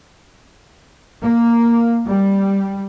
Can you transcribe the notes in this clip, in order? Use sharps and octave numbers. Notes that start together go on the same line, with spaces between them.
A#3
G3